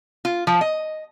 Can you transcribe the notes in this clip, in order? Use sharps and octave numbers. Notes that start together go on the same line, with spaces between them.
F4
F3
D#5